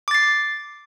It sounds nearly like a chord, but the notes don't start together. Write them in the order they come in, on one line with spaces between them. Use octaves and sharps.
D6 A6 C7